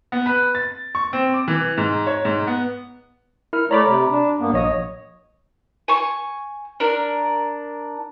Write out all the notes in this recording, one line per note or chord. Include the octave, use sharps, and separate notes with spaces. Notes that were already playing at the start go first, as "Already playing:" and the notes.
B3
B4
A6
C#6
C4
D6
E3
G#2
C#5
G#2
B3
E4 A#4 F6
A3 C#5 D5 A#5 B5 D6
C3
D4
G2 A#3 B3
A#1 C#5 D#5 D#6
G#5 C#6
D4 A#4